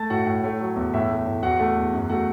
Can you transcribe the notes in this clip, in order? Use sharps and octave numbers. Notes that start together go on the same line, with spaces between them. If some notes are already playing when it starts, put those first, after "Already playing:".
Already playing: A3 A5 A6
A2 F#4 F#5
A2
A3 C#5
F#3
E2
A2 E5
A3
A2
E2 F#4 F#5
A3
E2
F#2
A3 F#4 F#5